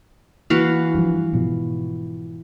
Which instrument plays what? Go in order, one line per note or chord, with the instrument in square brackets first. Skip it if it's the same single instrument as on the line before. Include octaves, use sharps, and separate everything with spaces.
[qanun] E3 F#4 F5 [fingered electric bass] A#3
[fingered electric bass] G2 F3
G#2 B2 F3